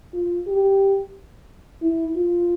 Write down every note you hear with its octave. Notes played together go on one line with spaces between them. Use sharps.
F4
G4
E4
F4